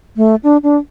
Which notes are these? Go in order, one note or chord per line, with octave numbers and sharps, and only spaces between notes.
A3
D4
D4